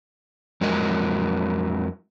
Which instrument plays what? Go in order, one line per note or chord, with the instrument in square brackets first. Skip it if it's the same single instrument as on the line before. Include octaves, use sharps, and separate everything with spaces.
[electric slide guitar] F2 F#3 G#3 A#4 D#5